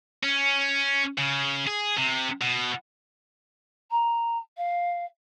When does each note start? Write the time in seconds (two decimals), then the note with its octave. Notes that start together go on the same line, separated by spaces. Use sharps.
0.23 C#4
1.18 C#3
1.67 G#4
1.97 C3
2.41 B2
3.91 A#5
4.57 F5